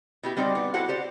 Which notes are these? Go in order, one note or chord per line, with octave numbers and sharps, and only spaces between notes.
B2 E4 G4
G3 C4 D#4 F#4 D5
B3
E4 F#4 G4 A4 C5 F#5
G4 C5 D5